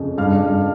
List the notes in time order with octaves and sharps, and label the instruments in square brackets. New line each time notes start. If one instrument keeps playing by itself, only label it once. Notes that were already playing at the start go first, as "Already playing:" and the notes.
Already playing: [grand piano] F2 C#3
G2 F5 F6
G2